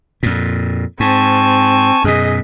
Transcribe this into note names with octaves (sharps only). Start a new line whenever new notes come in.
F2 A#2
G#2 C4 G#5 A5 C#6
F#2 B2 G#4 D#5